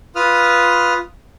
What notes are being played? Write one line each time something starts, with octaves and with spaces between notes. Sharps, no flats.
F4 B4 D#6 F6